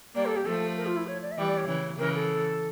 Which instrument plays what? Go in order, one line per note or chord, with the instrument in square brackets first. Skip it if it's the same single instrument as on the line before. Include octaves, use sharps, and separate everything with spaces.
[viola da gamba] G3 A#3 [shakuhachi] D5
[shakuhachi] A4
G4
[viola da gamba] F3 A3 [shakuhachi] A4
[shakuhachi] A#4
F4
E4
C#5
D5
E5
[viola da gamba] E3 G3 [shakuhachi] D5
[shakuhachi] D5
C#5
[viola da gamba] C#3 E3
[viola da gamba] C#3 E3 [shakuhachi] A#4
[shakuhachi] A4